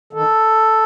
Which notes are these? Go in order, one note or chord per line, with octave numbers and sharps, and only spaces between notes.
D#3 A4